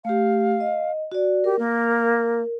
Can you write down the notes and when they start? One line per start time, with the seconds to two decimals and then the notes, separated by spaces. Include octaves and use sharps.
0.05 A3 G4 F5
0.60 D#5
1.12 F#4 D5
1.44 G4 A#4
1.59 A#3